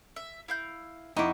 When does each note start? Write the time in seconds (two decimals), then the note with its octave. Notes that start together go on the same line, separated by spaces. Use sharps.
0.16 E5
0.48 E4 F5 G6
1.16 F2 D#4 E4 F#5 G5 C#6 D6